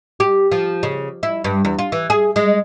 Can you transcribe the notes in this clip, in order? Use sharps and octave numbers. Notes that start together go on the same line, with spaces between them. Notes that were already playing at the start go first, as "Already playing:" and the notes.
G4
F3
C#3
E4
G2
E2
F4
E3
G#4
G#3